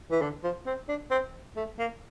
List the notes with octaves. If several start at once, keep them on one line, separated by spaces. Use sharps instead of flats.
E3
D3
F3
C4
D4
C4
A3
A#3